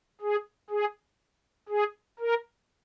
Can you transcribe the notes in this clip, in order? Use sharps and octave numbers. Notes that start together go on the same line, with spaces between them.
G#4
G#4
G#4
A#4